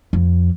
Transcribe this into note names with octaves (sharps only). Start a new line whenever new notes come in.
F2